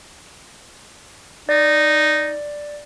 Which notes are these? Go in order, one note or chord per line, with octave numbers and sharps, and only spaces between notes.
D#4 D5